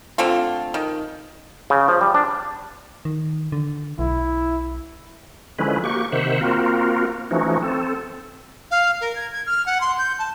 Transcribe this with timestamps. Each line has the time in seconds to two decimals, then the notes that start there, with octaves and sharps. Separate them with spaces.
0.18 D3 A3 C4 F4
0.74 D#3
1.70 C#3
1.88 F3
2.01 G3
2.15 D4
3.05 D#3
3.52 D3
3.99 B1 E4
5.59 D3 F3 G#3 C#4 E4 B4
5.84 A#3 F#4 G4 C#6
6.12 C3 D#3 C5 E5 F#5
6.41 A#3 C4 F4 F#4 A#4
7.31 E3 F3 A3 C#4 D#4 F#4
7.63 C4 A4
8.71 F5
9.01 A#4
9.16 G#6
9.33 G#6
9.46 F6
9.66 F#5
9.81 C6
9.99 G6
10.19 A5